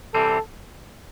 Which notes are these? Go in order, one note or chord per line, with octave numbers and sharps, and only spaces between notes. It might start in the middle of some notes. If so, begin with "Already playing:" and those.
C3 E3 G3 C4 A4